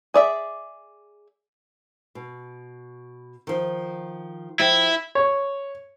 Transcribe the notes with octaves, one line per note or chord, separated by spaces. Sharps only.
G#4 D5 E5
B2
D#3 F3
F3 E4 G4
C#5